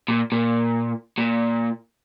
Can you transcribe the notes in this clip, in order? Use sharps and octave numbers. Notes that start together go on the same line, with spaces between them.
A#2
A#2
A#2